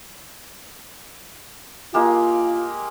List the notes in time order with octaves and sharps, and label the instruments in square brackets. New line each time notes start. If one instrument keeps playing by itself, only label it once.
[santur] G#3 A#3 G4 [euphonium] F4